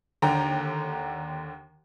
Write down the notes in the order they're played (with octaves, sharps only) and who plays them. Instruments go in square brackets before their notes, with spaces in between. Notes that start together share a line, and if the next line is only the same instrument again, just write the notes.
[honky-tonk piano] D#2 D3 G5 A#5